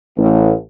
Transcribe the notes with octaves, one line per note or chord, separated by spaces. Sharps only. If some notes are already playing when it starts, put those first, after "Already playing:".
A1